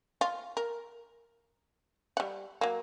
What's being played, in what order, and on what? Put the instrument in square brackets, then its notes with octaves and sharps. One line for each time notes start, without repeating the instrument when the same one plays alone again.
[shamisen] F4
A#4
G3 F#5
F#3 A#3